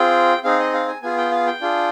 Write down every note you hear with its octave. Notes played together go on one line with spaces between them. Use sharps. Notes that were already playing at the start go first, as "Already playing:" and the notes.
Already playing: C4 F4 G#4 G5
C4 D#4 G#4 F5
D#5
F5
G#5
B3 F4 G#4 G#5
G5
F5
G5
D4 F4 G#4